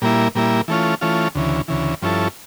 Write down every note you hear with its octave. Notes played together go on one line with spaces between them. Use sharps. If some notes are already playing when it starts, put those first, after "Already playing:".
A#2 G3 A#3 E4
A#2 G3 A#3 E4
E3 A3 C#4 F4
E3 A3 C#4 F4
D2 C#3 E3
D2 C#3 E3
G2 F3 C#4 E4 A4